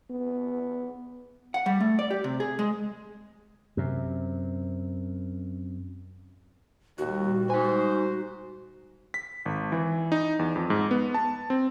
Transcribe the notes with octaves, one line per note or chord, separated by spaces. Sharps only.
B3
F#5
G3
A3
D5
G4
C3
G#4
G#3
F#2 C3
D#2 A#2 G3 F#4
D#4 C5 G#5
B6
G#1
E3
D#4
E2
F2
G#2
B3
A5
C4